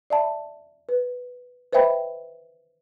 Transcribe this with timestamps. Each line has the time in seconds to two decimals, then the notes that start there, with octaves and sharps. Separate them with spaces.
0.10 D5 E5 A5 B5
0.89 B4
1.73 B4 C5 D#5 E5 G5 B5